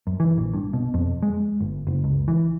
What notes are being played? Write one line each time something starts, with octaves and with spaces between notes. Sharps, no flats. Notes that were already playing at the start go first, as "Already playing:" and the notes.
F#2
E3
A#1
G2
B2
F2
G#3
G1
F#1
C#2
E3